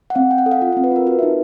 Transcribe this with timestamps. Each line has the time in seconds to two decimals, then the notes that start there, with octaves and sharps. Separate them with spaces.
0.10 F#5
0.15 C4 F5
0.31 C4 G5
0.38 F#5
0.46 A4
0.51 F5
0.62 F4 F#5
0.72 F5
0.77 C4
0.84 B4
0.92 F4 A#4
1.07 F#4 B4
1.19 E5
1.23 D#4